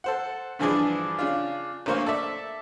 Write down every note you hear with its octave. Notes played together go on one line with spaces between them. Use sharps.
A4 C5 F#5
G2 D3 E3 F3 D4 G#4
C#3 D4 F4
A1 D3 A#3 C5 C#6
A4 D5 E5